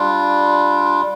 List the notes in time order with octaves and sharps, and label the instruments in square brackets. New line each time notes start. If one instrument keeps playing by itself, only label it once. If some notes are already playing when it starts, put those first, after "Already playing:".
Already playing: [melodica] G3 D4 F4